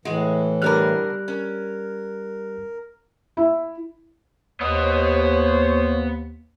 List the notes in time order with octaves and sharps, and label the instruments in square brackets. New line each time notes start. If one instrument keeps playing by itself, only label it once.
[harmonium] A2 E3 [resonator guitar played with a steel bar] G#3 F#4
[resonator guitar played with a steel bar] B2 D3 A#4 [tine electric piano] G3 F6 F#6
[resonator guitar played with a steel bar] C#4 [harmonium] A#4
[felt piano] E4
[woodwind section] D#2 [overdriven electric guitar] B3 D#5 [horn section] C5 C#5